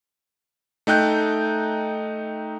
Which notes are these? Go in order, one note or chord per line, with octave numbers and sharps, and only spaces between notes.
A3 D#4 G5 F#6 G6